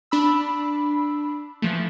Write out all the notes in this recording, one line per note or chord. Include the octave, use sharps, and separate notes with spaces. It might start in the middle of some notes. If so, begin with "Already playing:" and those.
D4 B5 E6
E3 F3 A3